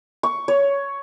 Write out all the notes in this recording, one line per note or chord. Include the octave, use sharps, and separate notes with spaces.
C#6
C#5